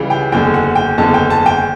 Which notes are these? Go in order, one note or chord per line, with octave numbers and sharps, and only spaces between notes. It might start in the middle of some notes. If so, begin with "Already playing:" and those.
Already playing: C#2 C#3 E3 G3
G5
F#1 E2 D3 G5
F#5
G5
F#1 E2 D3 A5
G5
A5
G5